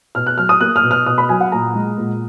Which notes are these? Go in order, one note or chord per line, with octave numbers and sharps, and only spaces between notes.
B2 F6
F#6
F#3 F6
D#6
A#3 F#6
F6
B2
F6
B2 D#6
B5
F#3 G#5
F#5
A#2 A#5
G#3
A#2